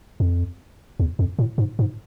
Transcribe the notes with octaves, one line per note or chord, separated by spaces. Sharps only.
F2
E2
F2
A2
G#2
G#2